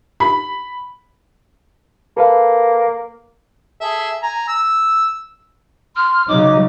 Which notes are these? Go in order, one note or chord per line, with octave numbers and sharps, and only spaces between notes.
B5
A#3 A4 B4 F5
G#4 A4 E5
G#5 A#5
E6
C6 F6
C#3 F#3 D#4 D6